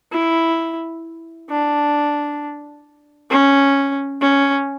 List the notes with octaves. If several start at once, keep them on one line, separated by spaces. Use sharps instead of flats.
E4
D4
C#4
C#4